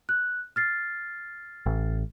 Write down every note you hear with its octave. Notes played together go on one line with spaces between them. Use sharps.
F#6
F6 A6 C7
A1